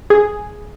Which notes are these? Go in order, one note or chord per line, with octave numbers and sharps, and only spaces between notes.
G#4